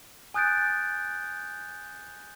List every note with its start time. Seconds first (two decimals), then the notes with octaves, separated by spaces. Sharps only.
0.34 G#5 D#6 F#6 G6 A6 D7